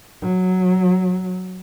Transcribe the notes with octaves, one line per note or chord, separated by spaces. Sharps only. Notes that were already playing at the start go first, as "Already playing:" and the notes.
F#3